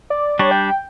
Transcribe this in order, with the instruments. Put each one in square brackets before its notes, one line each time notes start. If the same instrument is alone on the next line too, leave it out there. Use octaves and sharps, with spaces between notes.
[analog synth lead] D5
[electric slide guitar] G3 D4 [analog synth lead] C#5
[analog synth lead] G5